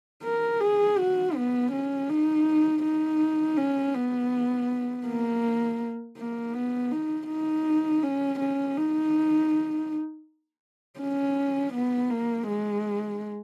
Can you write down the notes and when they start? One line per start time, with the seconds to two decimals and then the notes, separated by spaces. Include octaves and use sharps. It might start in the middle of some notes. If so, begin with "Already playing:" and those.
0.24 A#4
0.61 G#4
0.98 F#4
1.36 B3
1.72 C#4
2.09 D#4
2.84 D#4
3.57 C#4
3.95 B3
5.06 A#3
6.17 A#3
6.54 B3
6.91 D#4
7.28 D#4
8.03 C#4
8.40 C#4
8.77 D#4
11.00 C#4
11.74 B3
12.10 A#3
12.48 G#3